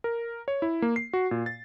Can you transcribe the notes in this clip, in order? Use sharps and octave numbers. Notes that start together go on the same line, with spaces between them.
A#4
C#5
E4
A#3
C7
F#4
A#2
A6